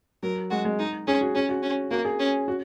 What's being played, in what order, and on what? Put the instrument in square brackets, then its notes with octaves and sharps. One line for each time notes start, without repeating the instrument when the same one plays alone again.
[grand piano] F#3 [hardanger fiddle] A#4
[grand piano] G#3 [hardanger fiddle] F#4
[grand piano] G#3
[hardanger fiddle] D#4
[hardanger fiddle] C#4 [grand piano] G#4
[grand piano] F#4
[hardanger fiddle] C#4 [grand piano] G#4
[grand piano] F#4
[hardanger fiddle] C#4
[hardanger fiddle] A#3 [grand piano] F#4
[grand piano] G#4
[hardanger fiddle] C#4
[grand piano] F#4